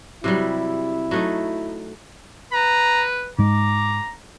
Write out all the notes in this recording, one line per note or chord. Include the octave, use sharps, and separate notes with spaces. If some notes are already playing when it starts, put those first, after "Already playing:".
C3 F#3 G3 E4
F#3 A3 D#4
B4 A#5
G#2 G#3 A#5 D6